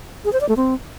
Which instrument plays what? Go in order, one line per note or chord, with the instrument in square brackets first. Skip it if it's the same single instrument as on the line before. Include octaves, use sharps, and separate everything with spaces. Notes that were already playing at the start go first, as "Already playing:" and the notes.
[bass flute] G#4
C5
D5
A3
C4